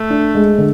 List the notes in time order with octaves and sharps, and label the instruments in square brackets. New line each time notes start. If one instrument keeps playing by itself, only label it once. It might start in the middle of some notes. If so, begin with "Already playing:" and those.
Already playing: [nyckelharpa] A3
[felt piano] D4
G#3
D3